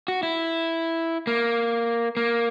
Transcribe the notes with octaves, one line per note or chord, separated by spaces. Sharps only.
F#4
E4
A#3
A#3